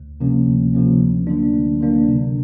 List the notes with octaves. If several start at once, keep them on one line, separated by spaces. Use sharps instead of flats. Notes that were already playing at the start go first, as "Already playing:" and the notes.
Already playing: D2
C3 F3 A#3 C#4
D2
C3 F3 A#3 C#4
D2
D3 F#3 A#3 D4
D2
D3 F#3 A#3 D4
C3